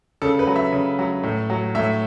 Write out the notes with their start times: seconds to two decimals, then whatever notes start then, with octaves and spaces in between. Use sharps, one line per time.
0.22 C#3 A4
0.39 B4
0.47 F#3
0.56 E5
0.73 C#3
0.99 F#3
1.23 A2
1.50 F#3
1.75 A2 E5